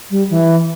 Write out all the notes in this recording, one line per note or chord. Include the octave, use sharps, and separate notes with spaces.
G3
E3